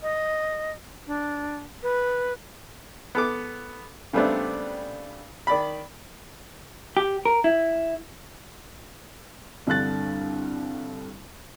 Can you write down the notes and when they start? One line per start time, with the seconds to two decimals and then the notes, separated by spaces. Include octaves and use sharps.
0.03 D#5
1.07 D4
1.83 B4
3.15 B3 A4 D6
4.13 C#3 G3 A3 B3 C4 D4
5.47 D#3 D5 B5
6.97 G4
7.25 A#4
7.44 E4
9.67 C2 G2 D3 F#6 A6